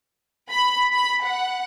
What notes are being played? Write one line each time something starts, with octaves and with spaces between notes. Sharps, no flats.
B5
B5
F#5